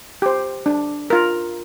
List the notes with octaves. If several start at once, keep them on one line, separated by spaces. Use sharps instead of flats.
G4 C5
D4
F4 A#4